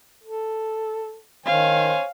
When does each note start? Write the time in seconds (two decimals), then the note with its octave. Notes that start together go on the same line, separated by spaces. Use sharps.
0.23 A4
1.46 D#3 C5 C#5 F5 G#5